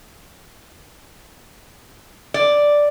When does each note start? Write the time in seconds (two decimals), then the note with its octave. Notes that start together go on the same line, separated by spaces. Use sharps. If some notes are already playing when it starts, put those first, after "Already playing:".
2.34 D5